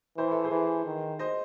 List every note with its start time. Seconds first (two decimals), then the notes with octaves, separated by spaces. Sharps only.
0.17 E3 C5
0.31 A4
0.44 G#4 C5
0.51 E3
0.86 D#3
1.19 C5 D#5